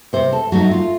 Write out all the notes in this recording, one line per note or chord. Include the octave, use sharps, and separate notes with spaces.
C3 C5
A4
F#3 A3 D#4 F#4
F4